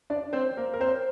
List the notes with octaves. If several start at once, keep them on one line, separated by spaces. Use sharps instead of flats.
D4 D5
C4 C5
A#3 A#4
A#4
C4 C5